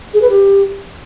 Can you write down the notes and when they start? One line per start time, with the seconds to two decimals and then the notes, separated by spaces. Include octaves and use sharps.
0.14 G#4
0.22 B4
0.30 G4